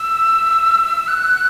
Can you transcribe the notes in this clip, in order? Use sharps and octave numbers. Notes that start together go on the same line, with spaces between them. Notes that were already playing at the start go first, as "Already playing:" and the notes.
Already playing: E6
F#6